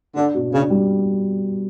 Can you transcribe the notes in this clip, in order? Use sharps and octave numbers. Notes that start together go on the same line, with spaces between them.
D3 D4
B2
C#3 D4
G3